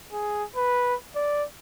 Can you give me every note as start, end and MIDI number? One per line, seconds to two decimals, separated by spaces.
0.13 0.44 68
0.56 0.95 71
1.16 1.44 74